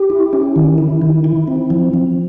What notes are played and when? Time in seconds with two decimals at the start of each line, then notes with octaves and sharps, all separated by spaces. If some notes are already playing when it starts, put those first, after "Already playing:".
Already playing: G4
0.10 E4
0.33 C#4
0.56 D#3
0.78 E4
1.02 D#3
1.24 E4
1.48 C4
1.70 F3
1.94 F3